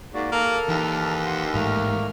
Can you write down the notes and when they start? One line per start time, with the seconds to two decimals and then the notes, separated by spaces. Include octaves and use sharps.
0.14 G#2 A#3 F#4 D5
0.32 A#3 A4 A#4 F6
0.69 D#2 E3
1.26 F#5 C6
1.54 A1 G#2 A3 A#3 F6